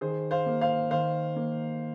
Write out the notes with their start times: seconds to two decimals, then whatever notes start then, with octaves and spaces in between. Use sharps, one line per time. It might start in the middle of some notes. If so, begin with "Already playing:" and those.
0.01 D#3 G#4 C5
0.31 C5 F5
0.46 A#3
0.61 C5 F5
0.91 D#3 C5 F5
1.36 A#3